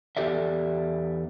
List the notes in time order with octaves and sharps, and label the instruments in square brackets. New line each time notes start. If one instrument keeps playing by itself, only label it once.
[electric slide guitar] E2 G#2 G4 A4 D5 E5